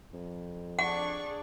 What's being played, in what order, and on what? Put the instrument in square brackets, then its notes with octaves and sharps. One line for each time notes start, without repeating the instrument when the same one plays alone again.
[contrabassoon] F2
[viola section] D4 G#4 [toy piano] F#5 [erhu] C#6